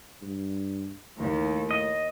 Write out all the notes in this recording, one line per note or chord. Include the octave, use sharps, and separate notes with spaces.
G2
D#2 A2
D#5